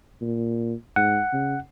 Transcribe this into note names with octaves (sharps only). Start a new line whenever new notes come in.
A#2
G#2 F#5
C#3